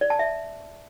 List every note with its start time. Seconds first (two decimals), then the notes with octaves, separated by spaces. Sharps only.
0.01 D5
0.10 A5
0.19 E5